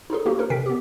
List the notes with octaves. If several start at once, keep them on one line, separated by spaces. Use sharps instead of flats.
D#4 F4 G#4 A4
A#3 D4 D#4 F#4 G4 A4
D#4 A4 A#4
C3 A#4 G5 B6
B3 G4